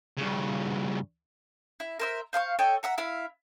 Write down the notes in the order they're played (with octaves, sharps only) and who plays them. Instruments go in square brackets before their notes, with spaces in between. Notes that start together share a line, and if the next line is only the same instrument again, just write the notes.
[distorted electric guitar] G2 C#3
[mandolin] E4
A#4 C5 E5
C5 F5 G#5 C#6
A4 C#5 D#5 G5
E5 F#5 A#5
E4 E5 F5